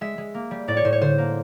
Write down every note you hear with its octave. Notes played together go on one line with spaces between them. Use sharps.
G#3 E5
G#3
A#3
G3
A2 D5
C#5
A2 C5
C#5
D3 C5
A#3